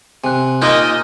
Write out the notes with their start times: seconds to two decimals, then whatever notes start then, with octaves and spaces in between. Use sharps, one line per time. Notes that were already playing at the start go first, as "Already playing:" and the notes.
0.24 C3 G#5 F#6
0.62 A#2 D#4 D#5 D6 F6 G6